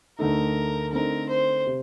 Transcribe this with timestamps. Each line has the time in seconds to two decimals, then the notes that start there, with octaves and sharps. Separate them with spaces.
0.19 D2 D3 A3 D#4 A#4
0.93 D3 A3 C4 D#4 A#4
1.29 C5
1.67 C3